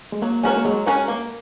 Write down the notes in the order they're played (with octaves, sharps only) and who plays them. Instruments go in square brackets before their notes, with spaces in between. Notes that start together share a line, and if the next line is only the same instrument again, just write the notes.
[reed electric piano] G#3
[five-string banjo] F#3 [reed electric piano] A#3
[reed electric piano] G#3 [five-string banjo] C#4 F#4 A#4 C#5
[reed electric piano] A#3
[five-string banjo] F#3 [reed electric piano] G#3
[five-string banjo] C#4 F#4 A#4 C#5
A#3